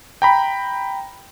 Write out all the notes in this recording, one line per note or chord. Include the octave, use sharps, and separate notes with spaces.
G5 A#5 B5